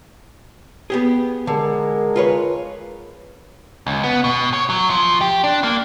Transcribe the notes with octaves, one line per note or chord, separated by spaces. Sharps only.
B3 G4 G#4
D3 G#3 A#4
F4 B4 C#5
C#2
B3
B2
C#5
F#3
F3
G4
D4
A#3